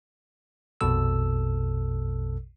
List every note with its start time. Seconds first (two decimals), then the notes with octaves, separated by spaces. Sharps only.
0.81 A#1 F2 B2 A4 E6